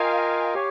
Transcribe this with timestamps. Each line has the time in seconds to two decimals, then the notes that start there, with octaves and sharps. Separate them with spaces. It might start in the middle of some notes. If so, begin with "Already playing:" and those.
Already playing: F4 A#4 D#5 F5 G5 G#5
0.54 G4 C#5